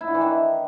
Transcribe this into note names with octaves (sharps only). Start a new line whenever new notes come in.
E4
D3
E3
D#3